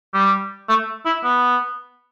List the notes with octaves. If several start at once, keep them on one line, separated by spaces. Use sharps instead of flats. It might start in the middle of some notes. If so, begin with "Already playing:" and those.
G3
A3
E4
B3